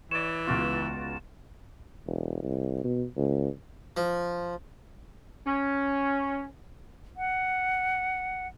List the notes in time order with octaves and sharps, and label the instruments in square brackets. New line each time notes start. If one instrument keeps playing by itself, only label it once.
[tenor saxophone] E3 [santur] C#5 D5 [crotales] E7
[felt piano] C#2 B3 [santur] F4 F#4
[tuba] E1
C2
B2
C#2
[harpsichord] F3
[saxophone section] C#4
[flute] F#5